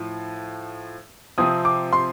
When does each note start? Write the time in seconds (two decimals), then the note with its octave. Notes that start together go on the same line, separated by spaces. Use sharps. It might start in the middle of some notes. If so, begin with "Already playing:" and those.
Already playing: A2 F3
1.38 C3 F3 C4 D#6
1.65 D6
1.93 C6